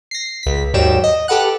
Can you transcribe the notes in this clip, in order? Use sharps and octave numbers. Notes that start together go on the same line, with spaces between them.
A#6 C7
C#2 B6
D#2 G#2 F#3 G3 G5 E7
D#5
G4 A4 B4 F#5 F#6